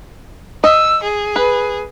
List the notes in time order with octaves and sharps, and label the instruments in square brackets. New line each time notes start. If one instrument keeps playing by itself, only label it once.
[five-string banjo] D#5 [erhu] E6
[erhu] G#4
[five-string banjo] B4